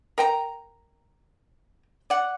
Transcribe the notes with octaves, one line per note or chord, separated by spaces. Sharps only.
A#4 G5 A#5
D5 F#5